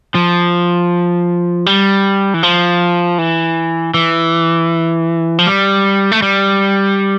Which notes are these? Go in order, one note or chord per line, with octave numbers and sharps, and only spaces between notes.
F3
G3
E3
F3
E3
E3
F3
G3
A3
G3